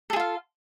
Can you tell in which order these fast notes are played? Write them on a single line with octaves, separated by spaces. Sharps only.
A4 G#4 F4 F5